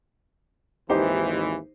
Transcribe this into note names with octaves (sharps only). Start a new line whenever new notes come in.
G#1 D#2 E3 D#4 G4 C5